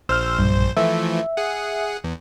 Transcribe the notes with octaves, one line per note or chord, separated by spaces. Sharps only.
A#1 C5 E6 F6
B1 G2
E3 F3 A3 E5
G#4 F#5
E2